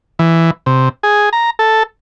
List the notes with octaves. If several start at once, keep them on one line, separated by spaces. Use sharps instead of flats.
E3
C3
G#4
A#5
A4